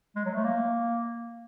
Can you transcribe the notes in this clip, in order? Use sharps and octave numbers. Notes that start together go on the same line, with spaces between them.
G#3
F#3
A3
A#3